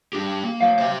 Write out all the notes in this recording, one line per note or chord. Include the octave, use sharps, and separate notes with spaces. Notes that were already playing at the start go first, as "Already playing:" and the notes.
D4 G4
A#3
F#3 F5
C5 E5